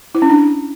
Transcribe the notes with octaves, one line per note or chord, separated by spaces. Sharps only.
E4
C#4
D4